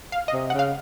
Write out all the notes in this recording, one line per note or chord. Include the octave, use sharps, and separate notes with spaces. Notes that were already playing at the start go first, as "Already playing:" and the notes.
F5
D#5
C3
C#3 F#5
F5